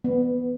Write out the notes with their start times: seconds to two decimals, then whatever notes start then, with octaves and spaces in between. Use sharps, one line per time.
0.04 B3